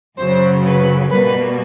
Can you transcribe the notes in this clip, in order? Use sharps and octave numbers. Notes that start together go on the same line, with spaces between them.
F#2 C#3 F#3 C5
B4
B2 G3 A#3 B4